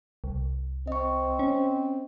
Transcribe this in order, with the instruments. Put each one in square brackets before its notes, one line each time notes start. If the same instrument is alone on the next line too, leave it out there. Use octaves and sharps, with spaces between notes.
[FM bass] C2
[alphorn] C4 [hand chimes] D#5 C#6
[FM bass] C#4